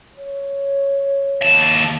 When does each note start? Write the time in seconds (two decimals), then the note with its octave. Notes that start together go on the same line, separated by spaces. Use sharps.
0.16 C#5
1.42 D#2 A5